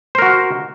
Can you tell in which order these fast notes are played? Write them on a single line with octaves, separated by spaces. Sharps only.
C5 A#4 F#4